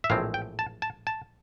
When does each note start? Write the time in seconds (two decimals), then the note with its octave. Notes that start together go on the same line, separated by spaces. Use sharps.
0.04 E5
0.10 A#1 A2 E3 G#3 C4 F5
0.34 G5
0.59 A5
0.82 A5
1.07 A5